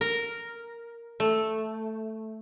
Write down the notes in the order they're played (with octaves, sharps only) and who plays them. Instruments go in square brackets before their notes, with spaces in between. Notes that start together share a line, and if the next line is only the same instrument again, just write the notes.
[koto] A#4
A3